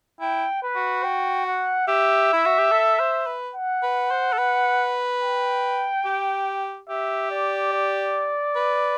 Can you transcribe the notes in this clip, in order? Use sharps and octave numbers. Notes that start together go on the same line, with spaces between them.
E4 G5
B4
F#4
G5
F#5
G4 E5
E4
F#4
G4
A4
C5
B4
F#5
B4
C5
A4
B4
G5
G4
G4 E5
D5
D5
B4